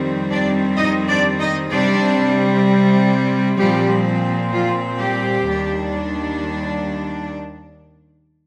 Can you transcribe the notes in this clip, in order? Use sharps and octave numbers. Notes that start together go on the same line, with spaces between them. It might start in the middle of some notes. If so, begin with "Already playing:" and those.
Already playing: F2 D#3 G3 C4
D4 D5
D#4 D#5
D4 D5
D#4 D#5
C3 G3 C4 D4 D5
A#2 F3 G3 C4 G4
F3 F4
G3 G4
D#2 D#3 G3 D4